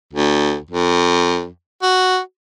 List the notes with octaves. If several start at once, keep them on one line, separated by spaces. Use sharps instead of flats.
D2
F2
F#4